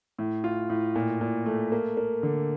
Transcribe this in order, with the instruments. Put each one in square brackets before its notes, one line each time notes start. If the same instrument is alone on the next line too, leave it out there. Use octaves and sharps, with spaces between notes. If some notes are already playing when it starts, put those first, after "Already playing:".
[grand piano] A2
F4
A2
A#2
A#2
A3
A#3
A#3
D3